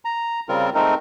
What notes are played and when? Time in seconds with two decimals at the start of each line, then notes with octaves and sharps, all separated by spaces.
0.05 A#5
0.49 C#3 G3 C4 F4 A#4
0.75 G#3 A3 C4 D#4 A#4